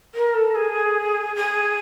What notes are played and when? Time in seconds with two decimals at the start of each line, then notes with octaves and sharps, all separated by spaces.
0.14 A#4
0.34 A4
0.55 G#4
1.35 G#4